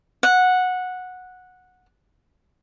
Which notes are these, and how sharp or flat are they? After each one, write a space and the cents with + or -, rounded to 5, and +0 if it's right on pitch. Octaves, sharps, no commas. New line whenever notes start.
F#5 -10